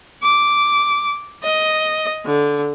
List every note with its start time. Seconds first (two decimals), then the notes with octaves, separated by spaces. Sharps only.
0.23 D6
1.44 D#5
2.26 D3